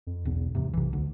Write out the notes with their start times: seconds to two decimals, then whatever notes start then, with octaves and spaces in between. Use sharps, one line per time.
0.07 F2
0.25 E1 B1 E2
0.55 E2 G#2 C3
0.73 B1 C3 E3
0.93 D2